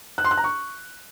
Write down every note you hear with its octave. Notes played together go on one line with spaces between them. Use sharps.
F#6
C6
F#6
A#5
C#6